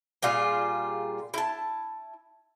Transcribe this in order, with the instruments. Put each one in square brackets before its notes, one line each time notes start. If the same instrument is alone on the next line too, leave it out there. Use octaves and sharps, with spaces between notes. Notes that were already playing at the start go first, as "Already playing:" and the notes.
[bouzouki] A#2 G3 F4 G#4
E4 A5